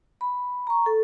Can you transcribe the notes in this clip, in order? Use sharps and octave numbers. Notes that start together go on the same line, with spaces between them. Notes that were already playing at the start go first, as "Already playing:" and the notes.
B5
A#5 C#6
A4